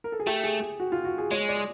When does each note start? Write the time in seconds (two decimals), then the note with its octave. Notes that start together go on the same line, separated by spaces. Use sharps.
0.04 A#4
0.12 A4
0.20 G#4
0.27 A3 G4
0.44 G#4
0.61 G#4
0.80 F#4
0.92 F4
1.05 F#4
1.18 G#4
1.31 G#3 C#5
1.49 D5